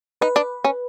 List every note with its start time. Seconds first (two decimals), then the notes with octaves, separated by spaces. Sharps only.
0.21 D#4 B4
0.36 D4
0.64 C#4